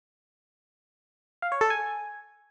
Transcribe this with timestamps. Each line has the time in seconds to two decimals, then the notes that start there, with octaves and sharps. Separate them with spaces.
1.42 F5
1.52 C#5
1.61 A4
1.70 G#5